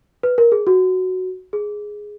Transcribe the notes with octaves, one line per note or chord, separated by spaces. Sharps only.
B4
A#4
G#4
F#4
G#4